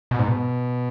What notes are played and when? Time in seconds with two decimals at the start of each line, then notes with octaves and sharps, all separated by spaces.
0.11 B2
0.19 G#2
0.28 B2